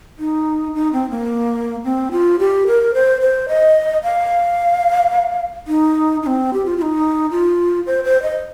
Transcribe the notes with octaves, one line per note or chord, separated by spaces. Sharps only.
D#4
D#4
C4
A#3
C4
F4
G4
A#4
C5
C5
D#5
F5
D#4
D#4
C4
G4
F4
F4
D#4
F4
C5
C5
D#5